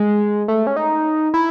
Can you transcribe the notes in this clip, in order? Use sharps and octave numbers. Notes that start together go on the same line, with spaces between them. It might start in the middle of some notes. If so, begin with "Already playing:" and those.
Already playing: G#3
A3
C#4
D#4
E4